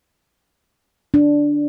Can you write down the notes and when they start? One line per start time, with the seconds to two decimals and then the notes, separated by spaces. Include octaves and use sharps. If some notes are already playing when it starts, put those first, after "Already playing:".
1.14 D4